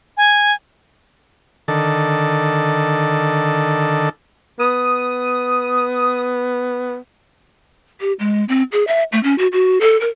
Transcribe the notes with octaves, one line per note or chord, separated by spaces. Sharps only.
G#5
D3 D#3 A4
B3 D#6
G4
G#3
C4
G#4
E5
A3
C#4
F#4
F#4
A4
A#4